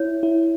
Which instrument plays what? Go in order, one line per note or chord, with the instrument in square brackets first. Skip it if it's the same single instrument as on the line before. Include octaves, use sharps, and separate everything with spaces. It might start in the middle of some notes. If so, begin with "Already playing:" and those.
Already playing: [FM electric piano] E4 [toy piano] C#5
[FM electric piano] E4